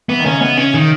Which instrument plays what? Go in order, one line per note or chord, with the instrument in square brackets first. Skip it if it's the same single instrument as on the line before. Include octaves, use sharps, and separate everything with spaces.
[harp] E3 [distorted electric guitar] B3
[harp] D#3
[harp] C#3 [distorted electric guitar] C#4
[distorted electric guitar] B3
C#4
D#3